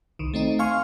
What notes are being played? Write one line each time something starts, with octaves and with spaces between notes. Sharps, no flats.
C2 D#3
A3 C4 D#4
F5 G#5 C6 C#6 F6